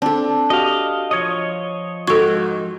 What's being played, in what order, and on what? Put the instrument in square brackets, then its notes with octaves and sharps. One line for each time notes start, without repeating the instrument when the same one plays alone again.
[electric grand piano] C4 [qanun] D4 A4
[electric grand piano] F#4 G4 [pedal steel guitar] D#5 F5
[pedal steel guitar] F3 C#5 D#5 [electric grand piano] D#6 G#6
[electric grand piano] G#2 G#6 [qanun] F#4 G5 [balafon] A4 C#6